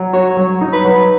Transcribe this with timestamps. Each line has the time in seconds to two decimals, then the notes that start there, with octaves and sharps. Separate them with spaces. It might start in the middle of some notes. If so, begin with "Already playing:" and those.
Already playing: F#3
0.13 F#4 C#5
0.37 F#3
0.61 D#4
0.73 B4
0.85 F#3